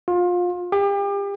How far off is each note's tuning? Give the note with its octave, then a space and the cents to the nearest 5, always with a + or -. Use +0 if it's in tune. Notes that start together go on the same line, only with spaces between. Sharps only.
F4 +25
G4 +35